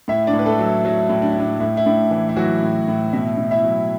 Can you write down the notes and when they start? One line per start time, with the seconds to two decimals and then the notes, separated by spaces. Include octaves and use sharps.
0.08 A2 E4 E5
0.27 D4 D5
0.33 A2
0.39 B4
0.46 A3 A4
0.59 F#3
0.66 E4
0.85 F#3 E4
1.09 A2
1.22 D4
1.32 E4
1.36 A2 D4
1.60 A2 E4
1.77 E4
1.86 A2 D4
2.11 E3 E4
2.29 E4
2.36 E3 F#3 F#4
2.63 A2
2.88 A2
3.12 B2 E4 E5
3.38 B2
3.51 E4 E5
3.64 F#3